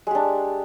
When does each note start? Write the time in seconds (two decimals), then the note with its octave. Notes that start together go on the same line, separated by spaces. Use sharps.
0.07 G#3
0.11 G4
0.15 D4